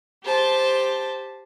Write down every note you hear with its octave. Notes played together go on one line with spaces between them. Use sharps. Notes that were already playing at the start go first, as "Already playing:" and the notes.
G4 C5 A5